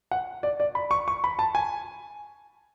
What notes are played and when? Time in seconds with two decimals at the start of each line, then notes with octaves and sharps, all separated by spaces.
0.11 F#5
0.43 D5
0.60 D5
0.75 B5
0.91 C#6
1.08 C#6
1.24 B5
1.39 A5
1.55 G#5